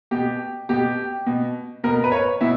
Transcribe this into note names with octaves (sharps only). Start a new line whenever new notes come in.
B2 G4
B2 G4
B2
B2 A#4
B4
C#5
B2 E4